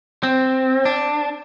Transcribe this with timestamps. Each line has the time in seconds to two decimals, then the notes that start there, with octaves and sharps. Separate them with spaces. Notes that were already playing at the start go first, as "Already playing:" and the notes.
0.23 C4
0.85 D4